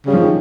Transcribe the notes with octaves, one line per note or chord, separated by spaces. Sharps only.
C#3 G3
F3
D#3